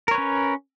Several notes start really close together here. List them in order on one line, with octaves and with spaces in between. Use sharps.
A#4 C#5 B4 C#4